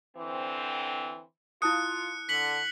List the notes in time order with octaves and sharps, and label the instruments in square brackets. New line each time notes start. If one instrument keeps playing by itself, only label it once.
[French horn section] D3 E3 C4
[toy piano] E4 A5 D#6 [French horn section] F4 [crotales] F#6 C#7
[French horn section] D3 [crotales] B6 C#7 F#7